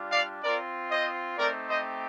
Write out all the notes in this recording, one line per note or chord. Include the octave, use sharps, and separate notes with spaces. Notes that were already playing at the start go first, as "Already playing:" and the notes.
Already playing: G3 D4 F4
D5 F5
C4 F4 A#4 D5
C5 D#5
A3 C4 D#4 G4 A#4 D5
C5 D#5